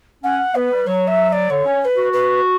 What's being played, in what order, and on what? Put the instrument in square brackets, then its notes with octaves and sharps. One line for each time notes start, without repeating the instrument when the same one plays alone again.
[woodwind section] C#4 [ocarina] F#5
[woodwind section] B3 [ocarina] B4
[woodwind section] G3
[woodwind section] F#3 [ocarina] C#5
[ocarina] E5
E5
D5
[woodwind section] D3 [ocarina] C#5
[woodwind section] C#4
[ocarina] C#5
B4
[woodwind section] F#4
[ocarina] B4